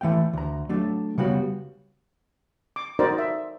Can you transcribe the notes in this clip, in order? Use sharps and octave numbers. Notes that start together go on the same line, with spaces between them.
E3 A3 F5 G5
D2 A#5
F#3 A3 D4
C#3 G3 B3 F#4
D6
D#4 F#4 A#4 C5 D5
E5